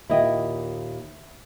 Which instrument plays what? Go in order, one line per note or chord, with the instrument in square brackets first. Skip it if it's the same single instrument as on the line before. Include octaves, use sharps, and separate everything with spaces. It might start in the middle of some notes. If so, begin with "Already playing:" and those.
[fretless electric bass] D#2 A#2 [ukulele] E4 D#5 G5